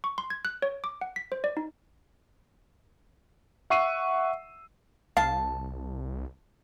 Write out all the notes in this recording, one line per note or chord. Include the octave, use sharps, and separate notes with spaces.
C#6
C6
G#6
F#6
C#5
D6
F#5
B6
C5
D5
D#4
E5 F#5 C#6 E6 C7 D#7
C2 F5 A5